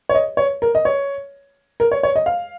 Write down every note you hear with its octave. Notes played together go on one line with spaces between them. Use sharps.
C#5
D#5
C#5
A#4
D#5
C#5
A#4
C#5
C#5
D#5
F5